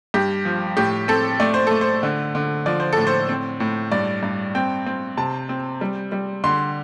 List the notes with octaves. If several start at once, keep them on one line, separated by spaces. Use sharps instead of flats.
G2 G4
F3
A2 G4
C4 A4
A3 D5
C5
A3 A4
C5
D3
D3
F3 D5
C5
A2 A4
C5
C4
A2
G2 D5
G2
C4 G5
C4
C3 A5
C4
G3
G3
D3 C6